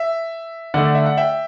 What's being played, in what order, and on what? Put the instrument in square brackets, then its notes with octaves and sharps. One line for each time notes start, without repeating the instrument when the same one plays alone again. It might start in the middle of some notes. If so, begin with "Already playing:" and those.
Already playing: [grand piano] E5
D3 A3 D4 D5 F#5
E5
F#5
E5 G5